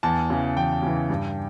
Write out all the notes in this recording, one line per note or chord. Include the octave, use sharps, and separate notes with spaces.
E2 A5
C#3 E3
E2 G5
C#3 E3
G2